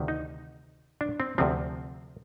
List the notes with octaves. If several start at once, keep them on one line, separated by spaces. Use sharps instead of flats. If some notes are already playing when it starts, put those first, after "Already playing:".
Already playing: D2 C3 D#3
D#4
D4
C4
D2 C3 F3 C4